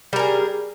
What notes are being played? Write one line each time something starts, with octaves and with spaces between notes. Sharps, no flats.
G3 G#4 A#4